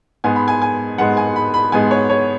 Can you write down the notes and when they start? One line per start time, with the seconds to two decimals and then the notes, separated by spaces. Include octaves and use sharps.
0.24 G#2 G#3 B3 G#5
0.36 B5
0.48 G#5
0.62 G#5
0.98 G#2 G#3 B3 F#5
1.17 G#5
1.36 B5
1.54 B5
1.72 G#2 G#3 B3 G#5
1.91 C#5
2.10 C#5